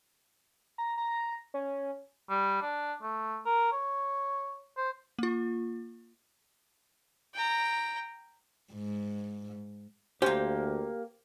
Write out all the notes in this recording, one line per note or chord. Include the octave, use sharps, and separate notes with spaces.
A#5
A#5
C#4
G3
D4
A3
A#4
C#5
C5
A#3 F4
G5 A#5
G#2
D2 A#3 C#4 G4 C5